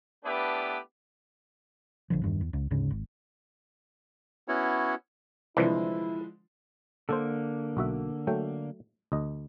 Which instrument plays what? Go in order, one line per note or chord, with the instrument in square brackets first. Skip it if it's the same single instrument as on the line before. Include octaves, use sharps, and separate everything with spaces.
[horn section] A3 B3 D4 E4 G4 B4
[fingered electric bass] A#1 D3 F3
E2 G2 D#3
E2
C#2
A1 D2 G#2 C#3
G#1
[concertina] B3 C#4 E4 F#4 C#5
[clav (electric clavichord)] C2 E3 [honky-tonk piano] D3 F3 G#3 [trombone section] E4
[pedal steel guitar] D3 A#3 [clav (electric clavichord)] A4 C5
[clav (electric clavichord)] B1 F#4 E5
F#3 A3 G5
D2 D#5